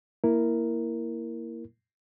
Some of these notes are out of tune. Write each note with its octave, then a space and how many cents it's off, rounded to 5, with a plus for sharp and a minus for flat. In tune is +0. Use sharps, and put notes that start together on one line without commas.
A#3 +0 E4 +0 A#4 +0